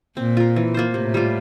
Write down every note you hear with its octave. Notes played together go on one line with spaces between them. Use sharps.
A#2 C4
F4 A#4
E3
A#3 F4 C5
A2 C3
G3 A#3 F4